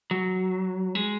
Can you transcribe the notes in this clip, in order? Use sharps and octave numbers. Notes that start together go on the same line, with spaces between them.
F#3
G#3